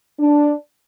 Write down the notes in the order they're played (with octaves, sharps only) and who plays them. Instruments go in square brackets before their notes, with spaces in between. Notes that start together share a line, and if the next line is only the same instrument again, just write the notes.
[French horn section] D4